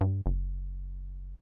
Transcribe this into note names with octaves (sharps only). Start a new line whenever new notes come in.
G2
F#1